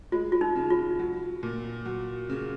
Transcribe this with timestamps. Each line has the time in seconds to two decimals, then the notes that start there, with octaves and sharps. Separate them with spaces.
0.12 G#3 F4
0.32 F4
0.41 D#4
0.55 C#3
0.70 F4
0.99 F#3
1.43 A#2
1.86 F#3
2.29 C#3